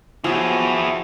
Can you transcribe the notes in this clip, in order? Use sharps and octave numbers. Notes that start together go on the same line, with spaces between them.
F3 F#3 E4 G4 G#4